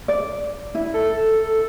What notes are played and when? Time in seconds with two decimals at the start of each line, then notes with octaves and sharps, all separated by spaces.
0.08 D5
0.75 E4
0.94 A4